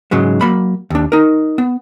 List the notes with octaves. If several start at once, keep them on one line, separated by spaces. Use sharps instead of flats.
G#2 C#3 F#3 G#3
F#3 A#3 B5
D#2 D4
D#4 A#4
B3